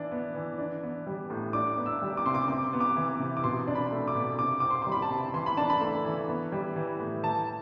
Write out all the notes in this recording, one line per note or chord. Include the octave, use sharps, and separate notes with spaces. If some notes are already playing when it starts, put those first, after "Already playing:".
Already playing: E3 D4
B3
E3
D4
B3
G3
A2
D4 D6
B3
E6
G3
D6
C3 C6
D6
C3 D6
B3
D6
E3
C3
D6
B2 C6
D4
B5
A3
D6
B2
C3 D6
C4 D6
C6
G3 C6
B5
A5
C3
E3 C6
B5
D4 A5
B5
A3
E3
B3
G3
E3
A2
E3 A5